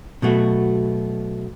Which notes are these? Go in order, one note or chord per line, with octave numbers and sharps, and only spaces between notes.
B2 F#3 A3 F#4